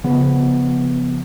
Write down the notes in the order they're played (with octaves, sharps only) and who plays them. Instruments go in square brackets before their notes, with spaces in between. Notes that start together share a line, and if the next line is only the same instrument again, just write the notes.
[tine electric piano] C#3 F3 B3